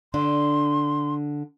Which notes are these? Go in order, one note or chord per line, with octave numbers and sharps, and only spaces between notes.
D3 D4 C6